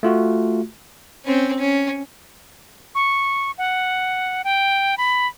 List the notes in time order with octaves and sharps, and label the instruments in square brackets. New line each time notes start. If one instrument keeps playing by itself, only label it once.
[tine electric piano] A3 F4 F#4
[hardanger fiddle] C4 C#4
C#4
[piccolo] C#6
F#5
G5
B5